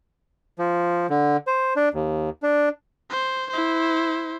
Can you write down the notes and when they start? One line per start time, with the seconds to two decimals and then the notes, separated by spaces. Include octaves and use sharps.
0.59 F3
1.10 D3
1.47 C5
1.76 D4
1.94 D#2
2.43 D4
3.10 C5
3.50 E4 C5